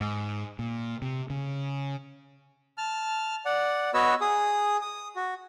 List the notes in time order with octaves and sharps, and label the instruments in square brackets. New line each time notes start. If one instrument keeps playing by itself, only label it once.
[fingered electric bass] G#2
A#2
C3
C#3
[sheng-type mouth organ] A5 F6
D5 F#5
B3 F#4 B4 C#5 D#5 E6
G#4 D#6
D#6
F#4